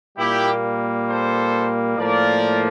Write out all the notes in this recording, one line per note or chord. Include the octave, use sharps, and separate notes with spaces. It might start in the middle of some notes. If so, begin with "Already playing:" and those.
A#2 G3 A#3 E4 G4
A4 C5
A2 F3 A#3 A#4 D5